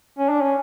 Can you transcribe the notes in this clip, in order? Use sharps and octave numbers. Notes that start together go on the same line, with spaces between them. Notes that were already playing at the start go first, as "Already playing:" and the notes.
C#4
D4
C#4